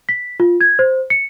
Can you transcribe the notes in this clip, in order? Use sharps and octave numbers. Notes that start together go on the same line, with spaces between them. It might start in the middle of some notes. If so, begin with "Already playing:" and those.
B6
F4
G#6
C5
C#7